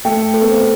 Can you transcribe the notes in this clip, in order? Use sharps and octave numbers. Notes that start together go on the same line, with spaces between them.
A3 G5
A4
B3
C4